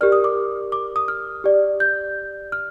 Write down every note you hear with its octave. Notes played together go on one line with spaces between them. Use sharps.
G4 A#4 D5 F6
D#6
D6
D6
D#6
F6
G4 D5
G6
F6